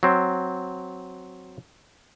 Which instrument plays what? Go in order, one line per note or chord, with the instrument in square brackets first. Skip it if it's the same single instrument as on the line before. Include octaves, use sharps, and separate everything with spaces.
[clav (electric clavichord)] F#3 C4